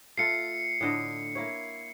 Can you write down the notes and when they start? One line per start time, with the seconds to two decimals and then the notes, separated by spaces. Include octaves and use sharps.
0.18 A3 F4 A4 C7 C#7
0.81 A2 D3 D#5
1.35 A#3 E4 C#5